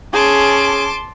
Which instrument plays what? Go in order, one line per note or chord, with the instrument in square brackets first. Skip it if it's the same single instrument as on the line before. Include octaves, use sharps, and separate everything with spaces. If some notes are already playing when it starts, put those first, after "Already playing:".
[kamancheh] C#4 G#4 [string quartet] A5 C6 D6